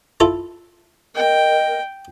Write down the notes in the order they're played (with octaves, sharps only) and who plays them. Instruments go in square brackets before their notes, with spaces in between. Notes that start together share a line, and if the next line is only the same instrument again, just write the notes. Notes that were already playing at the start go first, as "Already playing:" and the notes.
[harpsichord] E4 F4 A4
[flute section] A#4 D#5 [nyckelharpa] G5